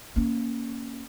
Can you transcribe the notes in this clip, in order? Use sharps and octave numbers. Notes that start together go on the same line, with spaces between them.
A#3 C#4